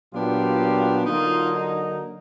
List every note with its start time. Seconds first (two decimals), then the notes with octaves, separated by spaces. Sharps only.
0.13 A#2 F#3 B3 D4 F4 G4
1.06 D3 F#3 A#3 D#4 F4
1.54 D#4